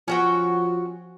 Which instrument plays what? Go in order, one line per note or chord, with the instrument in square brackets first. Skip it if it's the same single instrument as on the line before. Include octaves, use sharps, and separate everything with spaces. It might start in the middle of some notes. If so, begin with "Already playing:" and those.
[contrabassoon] F3 [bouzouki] C#4 F#4 G5